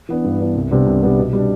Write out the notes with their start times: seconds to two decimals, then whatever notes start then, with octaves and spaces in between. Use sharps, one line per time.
0.09 E3 B3 D4
0.24 G2
0.40 E3 B3 D4
0.55 C2
0.71 C3 G3 B3 D4
0.87 C2
1.02 C3 G3 B3 D4
1.18 B2
1.33 G3 D4